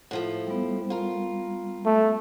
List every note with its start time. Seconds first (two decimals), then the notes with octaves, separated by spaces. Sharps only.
0.11 A2 F3 A3
0.47 G3 B3
0.90 F4 A#4
1.86 A3